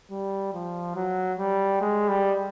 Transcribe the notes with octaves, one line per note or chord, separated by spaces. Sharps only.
G3
F3
F#3
G3
G#3
G3